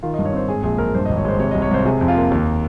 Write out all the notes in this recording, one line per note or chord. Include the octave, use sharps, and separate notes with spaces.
D#3 F4
D#5
G2
C#5
C4 C5
G#2 G#4
A#1 G#4
A#1 A#4
G2 C5
D#5
G#1
C#5
G#3 C5
C3 C#5
D#5
C2
C#5
C2 C5
C3 G#4
F2
F4
A#3
D#2